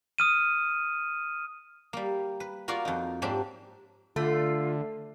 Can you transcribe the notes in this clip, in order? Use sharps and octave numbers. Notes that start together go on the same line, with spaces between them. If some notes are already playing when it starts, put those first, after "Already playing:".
D#6 F6 D#7
G3 A#3
B4
A#3 F4 F#4 A#4 D5 F5
F2 D#4
G#2 F#3 A#3 C4 D4 G4
D3 A3 F4